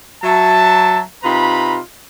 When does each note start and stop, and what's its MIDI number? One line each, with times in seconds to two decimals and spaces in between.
0.23 1.00 54
0.23 1.00 76
0.23 1.00 81
1.24 1.78 48
1.24 1.78 63
1.24 1.78 65
1.24 1.78 71
1.24 1.78 82
1.24 1.78 83